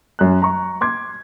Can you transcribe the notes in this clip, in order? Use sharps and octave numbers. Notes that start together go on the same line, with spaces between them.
F#2 F#6
A#5 C#6
C6 D6 G#6